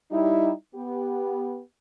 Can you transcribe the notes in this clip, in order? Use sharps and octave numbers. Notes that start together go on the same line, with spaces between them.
G3 D#4 E4
B3 G4